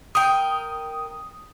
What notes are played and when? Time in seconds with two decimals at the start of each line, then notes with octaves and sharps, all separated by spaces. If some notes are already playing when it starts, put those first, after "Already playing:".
0.15 A#4 G5 D#6